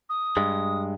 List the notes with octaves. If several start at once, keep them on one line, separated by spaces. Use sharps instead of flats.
D#6
G2 G#3